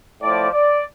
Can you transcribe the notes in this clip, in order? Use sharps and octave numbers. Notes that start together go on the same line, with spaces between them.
A2 F3 D5
D5